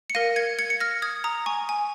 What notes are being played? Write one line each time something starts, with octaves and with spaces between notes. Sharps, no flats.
C#7
A#4 F5 A#6 D#7
G#6 C#7
G#6 C#7
C#7
F6 A#6
D#6 G#6
A#5 D#6
G#5 C#6
G#5